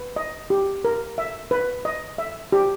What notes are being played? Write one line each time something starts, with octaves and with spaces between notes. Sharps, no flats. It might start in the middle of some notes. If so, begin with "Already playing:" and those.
Already playing: B4
D#5
G4
A#4
E5
B4
D#5
E5
G4